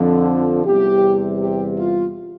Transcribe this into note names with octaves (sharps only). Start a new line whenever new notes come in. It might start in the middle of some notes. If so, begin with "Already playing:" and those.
Already playing: F2 D3 F3
E2 C3 G3 G4
G4
F4